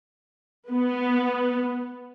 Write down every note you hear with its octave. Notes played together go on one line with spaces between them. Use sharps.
B3